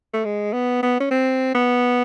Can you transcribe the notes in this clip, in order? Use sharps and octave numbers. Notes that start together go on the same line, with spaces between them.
A3
G#3
B3
B3
C#4
C4
B3